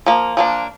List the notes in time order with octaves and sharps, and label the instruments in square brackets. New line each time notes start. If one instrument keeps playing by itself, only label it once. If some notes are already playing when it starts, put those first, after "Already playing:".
[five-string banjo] F3 A#3
F3 A#3 D4